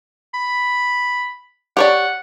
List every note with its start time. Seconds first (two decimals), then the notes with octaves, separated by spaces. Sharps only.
0.34 B5
1.77 G4 C#5 D5 F#5